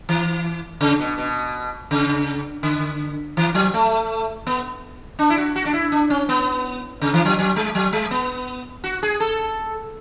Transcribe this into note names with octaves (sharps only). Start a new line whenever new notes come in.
E3
C#3
B2
B2
C#3
D3
E3
F#3
A3
B3
D4
E4
F#4
F#4
D4
E4
D4
C#4
B3
C#3
E3
F#3
F#3
G#3
F#3
G#3
B3
F#4
G#4
A4